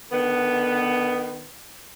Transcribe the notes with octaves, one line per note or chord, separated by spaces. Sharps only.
D3 D#3 B3